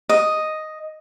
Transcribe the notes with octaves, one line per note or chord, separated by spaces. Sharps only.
D#5